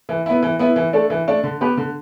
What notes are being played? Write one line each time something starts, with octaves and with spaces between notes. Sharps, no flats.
E3
B3 E4
E3
B3 E4
E3
A3 D4 A4
E3
A3 D4 A4
D3
B3 G4 B4
D3